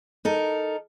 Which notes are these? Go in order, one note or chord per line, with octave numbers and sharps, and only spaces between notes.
D#4 A4 A#4